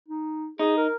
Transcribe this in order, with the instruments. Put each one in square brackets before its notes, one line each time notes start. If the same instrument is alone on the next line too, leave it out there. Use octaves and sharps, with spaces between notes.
[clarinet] D#4
[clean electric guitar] D#4 [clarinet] G#4
[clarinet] A#4